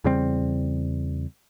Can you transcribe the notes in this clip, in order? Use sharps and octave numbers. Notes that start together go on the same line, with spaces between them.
E2 C#3 G3 C4